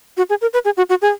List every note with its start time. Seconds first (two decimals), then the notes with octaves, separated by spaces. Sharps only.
0.17 F#4
0.30 G#4
0.41 A#4
0.53 B4
0.65 G#4
0.77 F#4
0.89 F#4
1.02 G#4